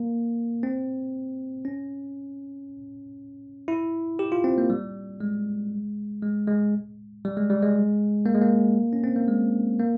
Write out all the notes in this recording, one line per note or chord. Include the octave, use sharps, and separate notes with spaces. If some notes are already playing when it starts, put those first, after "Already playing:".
Already playing: A#3
C4
C#4
E4
G4
F4
C4
A#3
G3
G#3
G#3
G#3
G3
G#3
G3
G#3
A#3
G#3
A#3
C#4
C4
A#3
G#3
A#3